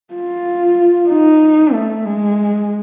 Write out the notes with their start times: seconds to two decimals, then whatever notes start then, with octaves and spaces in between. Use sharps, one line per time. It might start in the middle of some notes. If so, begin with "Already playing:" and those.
0.13 F4
1.09 D#4
1.74 A3
2.05 G#3